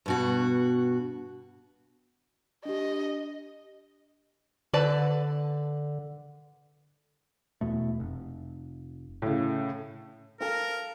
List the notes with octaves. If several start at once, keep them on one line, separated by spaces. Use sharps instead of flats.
G2 B2 F#4
D4 G4 D#5
D3 B4 D5 A5
E2 B2 A3
F1
A2 C#3
A4 A#4 F5